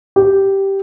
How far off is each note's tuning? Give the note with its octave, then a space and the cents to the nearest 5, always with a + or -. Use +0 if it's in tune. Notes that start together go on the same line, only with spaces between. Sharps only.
G4 -5